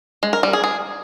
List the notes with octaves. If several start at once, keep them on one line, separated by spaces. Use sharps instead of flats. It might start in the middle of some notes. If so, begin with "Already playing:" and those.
G#3
A#4
G3
G#4
G#4